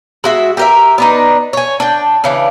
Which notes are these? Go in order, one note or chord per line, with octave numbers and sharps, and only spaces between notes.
G#3 F#4 E5
G4 A#4 E5
B3 D4 D#4
C#5 G#5
D4 G5
C#3 E3 D4